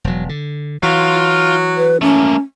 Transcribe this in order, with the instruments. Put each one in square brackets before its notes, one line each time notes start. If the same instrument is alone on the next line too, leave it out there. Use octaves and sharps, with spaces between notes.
[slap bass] E1 F#3
D3
[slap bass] E3 [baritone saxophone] F#3 [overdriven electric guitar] F4 F5
[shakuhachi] B4
[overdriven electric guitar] A3 A#3 [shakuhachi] C#4